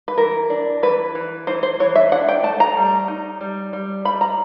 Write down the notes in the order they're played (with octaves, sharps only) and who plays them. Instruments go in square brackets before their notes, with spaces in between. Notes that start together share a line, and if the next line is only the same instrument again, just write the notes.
[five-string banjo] B4
E3 A#4
D4
E3 B4
E3
E3 C5
C5
E3 C#5
E5
D4 F#5
G5
A3 A5
A#5
G3
D#4
G3
G3
G3 B5
A#5